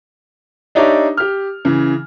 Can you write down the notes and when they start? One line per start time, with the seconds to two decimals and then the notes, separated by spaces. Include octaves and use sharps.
0.75 D4 D#4 G4 C#5 D5 E5
1.17 G4 F6
1.65 C#3 E3